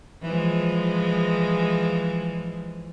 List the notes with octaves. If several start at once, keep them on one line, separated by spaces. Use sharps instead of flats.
E3 F3 G#3